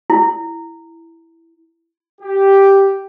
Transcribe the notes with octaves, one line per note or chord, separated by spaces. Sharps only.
E4
G4